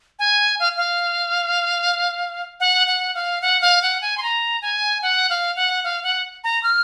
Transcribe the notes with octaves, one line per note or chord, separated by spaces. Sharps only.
G#5
F5
F5
F#5
F#5
F5
F#5
F5
F#5
G#5
C6
A#5
G#5
F#5
F5
F#5
F5
F#5
A#5
F6